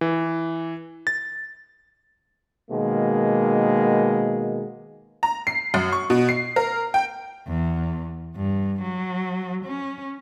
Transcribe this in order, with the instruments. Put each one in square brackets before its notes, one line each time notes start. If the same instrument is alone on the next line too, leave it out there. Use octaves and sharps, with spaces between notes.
[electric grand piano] E3
A6
[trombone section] B2 D#3 G#3 A#3
[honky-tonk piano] A#5
C7
F#2
C#6
B2
C7
A#4
G5
[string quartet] E2
G2
F#3
C#4